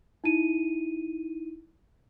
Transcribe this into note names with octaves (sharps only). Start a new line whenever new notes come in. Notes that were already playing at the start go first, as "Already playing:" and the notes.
D#4 E4 D#7